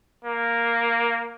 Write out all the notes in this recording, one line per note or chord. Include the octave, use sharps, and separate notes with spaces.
A#3